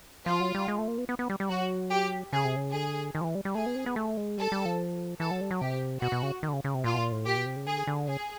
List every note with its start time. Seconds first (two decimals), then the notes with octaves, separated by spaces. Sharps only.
0.26 F3 F4
0.40 F#3
0.55 G3
0.68 G#3
0.78 A3
0.88 A#3
0.98 B3
1.09 B3
1.19 B3
1.30 G3
1.40 G3
1.49 F#3 F#4
1.91 G4
2.33 C#3 G#4
2.45 C3
2.56 C#3
2.73 D3 G#4
3.15 D#3
3.21 F3
3.24 E3
3.35 G3
3.45 G3
3.55 A3 G#4
3.66 B3
3.76 C4
3.86 B3
3.96 A3
4.17 G#3
4.38 G3 A4
4.52 G3
4.65 F3
5.20 E3 A4
5.31 F#3
5.41 G3
5.51 F#3
5.61 C3 G4
6.02 B2 F#4
6.12 B2
6.22 C#3
6.43 D#3
6.49 D3
6.53 C#3
6.64 C#3
6.75 C3
6.84 A#2 F4
6.93 B2
6.98 A#2
7.12 A2
7.25 A#2 G4
7.36 B2
7.46 C3
7.56 C#3
7.66 D3 G#4
7.87 D3
8.08 C#3 G#4